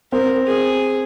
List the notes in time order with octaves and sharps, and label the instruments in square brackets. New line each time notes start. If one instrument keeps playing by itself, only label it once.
[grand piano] C4 [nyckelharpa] A#4
[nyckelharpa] G#4